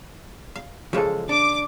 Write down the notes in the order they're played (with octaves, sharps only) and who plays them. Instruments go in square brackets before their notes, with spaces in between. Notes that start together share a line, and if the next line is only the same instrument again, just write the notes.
[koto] F5
[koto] C#3 E3 [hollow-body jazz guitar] F3 G#3 A4
[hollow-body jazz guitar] D4 [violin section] D6